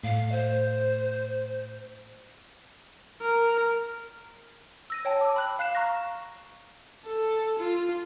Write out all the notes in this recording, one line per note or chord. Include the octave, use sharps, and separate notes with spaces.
A2 F5
C5
A#4
E6 A#6 D#7
C#5 G5 A5
D6 E6
B5 F#6 F#7
F5 F#6 C7 E7
A#5 C#6 F6 F#6 A#6
A4
F4